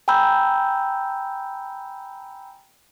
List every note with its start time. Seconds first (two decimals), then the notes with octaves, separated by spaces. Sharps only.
0.08 G5 G#5 A#5 B5 E6 G6